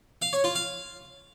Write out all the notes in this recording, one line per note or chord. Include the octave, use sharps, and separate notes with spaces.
F5
C#5
F4
F5